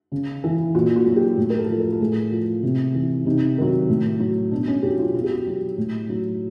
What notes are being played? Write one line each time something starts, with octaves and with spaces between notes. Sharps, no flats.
C#3
E3
A#2 F#4
F#4
F#3
G4
A2
A#4
A4
F3
A#4
A4
A2 G#4
F3
C3
E3
C3 D#4
D#3 F#3
A2
F#3
B2 D4
C#4
F#3 G4
E4
F4
B2 F#4
G4
F#4
F#3
A2
F#3